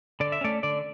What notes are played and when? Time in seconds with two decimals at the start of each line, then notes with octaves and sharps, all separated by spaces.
0.20 D3 D5
0.32 E5
0.41 A3 C#4 D5
0.63 D3 D5